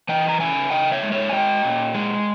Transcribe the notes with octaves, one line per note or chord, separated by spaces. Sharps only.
E3 D#5 G5
A#5
C#3 E5 G#5
C#3 D#5 G5
C#5 E5
G#3
C#5 E5
G#5
G#3 D#5 G5
A#2
G#3